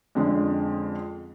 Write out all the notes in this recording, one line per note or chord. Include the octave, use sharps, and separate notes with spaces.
F2 D3 G#3 C#4